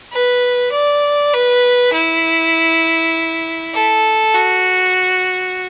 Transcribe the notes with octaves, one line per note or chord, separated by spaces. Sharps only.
B4
D5
B4
E4
A4
F#4